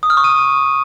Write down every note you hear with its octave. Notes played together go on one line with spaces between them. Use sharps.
D#6
F6
C#6
D#7